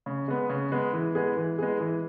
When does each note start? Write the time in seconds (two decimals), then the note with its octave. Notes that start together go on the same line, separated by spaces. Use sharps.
0.06 C#3
0.28 G#3 B3
0.49 C#3
0.72 G#3 B3
0.93 E3
1.15 G#3 B3 G#4
1.37 E3
1.58 G#3 B3 G#4
1.80 E3